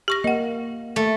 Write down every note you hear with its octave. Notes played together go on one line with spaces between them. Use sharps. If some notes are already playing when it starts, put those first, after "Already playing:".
G4 C#6 A#6
A#3 D#5 F#5
A3